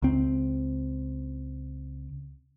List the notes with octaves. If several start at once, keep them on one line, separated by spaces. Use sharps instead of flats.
C#2 C4